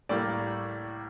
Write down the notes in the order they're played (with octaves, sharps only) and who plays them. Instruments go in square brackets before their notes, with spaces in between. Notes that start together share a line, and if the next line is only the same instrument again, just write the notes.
[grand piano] A2 G3 A#3 D5